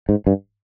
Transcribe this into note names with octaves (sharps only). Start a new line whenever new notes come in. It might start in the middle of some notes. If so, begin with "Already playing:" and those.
G#2
G2